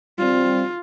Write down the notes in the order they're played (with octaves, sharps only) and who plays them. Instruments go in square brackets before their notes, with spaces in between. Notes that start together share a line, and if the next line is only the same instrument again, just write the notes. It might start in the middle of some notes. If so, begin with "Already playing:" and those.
[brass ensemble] G3 C4 [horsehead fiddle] F4